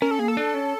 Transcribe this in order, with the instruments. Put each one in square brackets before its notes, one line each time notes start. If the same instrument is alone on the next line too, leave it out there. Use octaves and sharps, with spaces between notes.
[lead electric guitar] C#4 [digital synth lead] A#4
[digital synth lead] A4
[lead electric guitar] A#3 [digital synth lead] G#4
[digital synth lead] A4
[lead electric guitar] D4
C#4